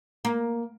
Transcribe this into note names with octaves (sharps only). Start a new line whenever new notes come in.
A#3